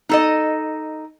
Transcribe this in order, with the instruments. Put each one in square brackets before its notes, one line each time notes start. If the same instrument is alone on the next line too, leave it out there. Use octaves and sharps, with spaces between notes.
[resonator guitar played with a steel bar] D#4 A4 D#5